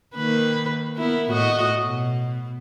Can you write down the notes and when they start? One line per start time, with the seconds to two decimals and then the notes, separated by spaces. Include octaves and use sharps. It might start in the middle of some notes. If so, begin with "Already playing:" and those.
0.16 D#3 A#3 B4
0.96 B3 E4 A#4
1.30 A2 F#4 D#5
1.85 B2